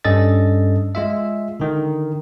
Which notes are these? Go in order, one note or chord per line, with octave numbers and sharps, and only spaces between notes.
G2 G3 C#4 A4 D#5 A6
G#3 F4 E5
D3 D#3